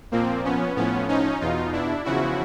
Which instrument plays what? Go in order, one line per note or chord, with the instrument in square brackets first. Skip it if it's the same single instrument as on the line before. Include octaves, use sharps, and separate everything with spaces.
[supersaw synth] A#2 F3 A#3 C4
B3 C#4
A2 F3 B3 C#4
C#4 D#4
E2 B2 D#4 F4
D4 E4
E2 C#3 F3 E4 F#4